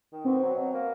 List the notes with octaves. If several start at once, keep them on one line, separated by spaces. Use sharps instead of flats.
D#3
B2 C4
F#3
B2
A#3